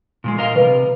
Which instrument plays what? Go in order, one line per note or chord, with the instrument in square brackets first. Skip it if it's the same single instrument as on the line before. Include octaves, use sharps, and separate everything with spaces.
[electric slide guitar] A#2 F3 G#3
A#4 D#5 F5
[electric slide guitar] C3 D#3 [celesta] B4